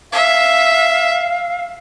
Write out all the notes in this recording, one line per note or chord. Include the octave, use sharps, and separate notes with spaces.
E5 F5